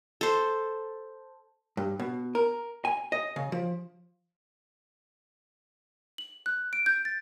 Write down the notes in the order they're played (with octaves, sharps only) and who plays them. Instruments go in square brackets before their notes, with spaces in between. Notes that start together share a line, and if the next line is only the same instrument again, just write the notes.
[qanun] A4 C5
[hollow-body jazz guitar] G2
B2
A#4
G#5
D#5
C#3
F3
[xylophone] F#7
F#6
D7
G6
A6